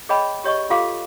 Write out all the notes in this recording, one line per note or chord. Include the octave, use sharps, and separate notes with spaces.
G#4 C#5 D#5 G5 B5
G4 C#5 D#5 C#6
F4 G4 A4 F5 D6